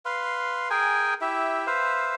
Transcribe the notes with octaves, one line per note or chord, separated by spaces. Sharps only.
B4 F5 C6
G#4 A#4 G5 G#5
E4 G4 E5
B4 C5 E5 F5